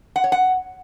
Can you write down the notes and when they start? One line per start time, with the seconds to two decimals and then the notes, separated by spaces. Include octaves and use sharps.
0.16 F#5
0.24 C#5
0.32 F#5